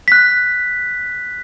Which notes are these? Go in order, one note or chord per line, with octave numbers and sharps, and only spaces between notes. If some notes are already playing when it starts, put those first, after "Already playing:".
F#6 B6